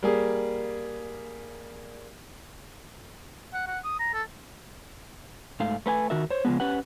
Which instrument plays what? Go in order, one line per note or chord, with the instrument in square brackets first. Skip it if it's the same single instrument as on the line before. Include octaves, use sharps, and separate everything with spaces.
[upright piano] G3 A#3 G#4
[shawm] F#5
F#5
D#6
A#5
A4
[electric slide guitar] G#2 A3 F5
A3 B4 G5 G#5
D#3 F#4 A#4 E5
C5 C#5
C#3 E3 F3 G#3 B3
C#4 G4 B4 F#5